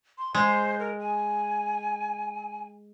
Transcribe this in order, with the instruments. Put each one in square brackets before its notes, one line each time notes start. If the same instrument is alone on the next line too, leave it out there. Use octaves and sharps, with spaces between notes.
[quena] C6
[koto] G#3 [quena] C5
[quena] A#4
G#5